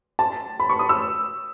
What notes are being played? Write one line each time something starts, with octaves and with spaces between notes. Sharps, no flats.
A5
B5
C#6
D#6
E6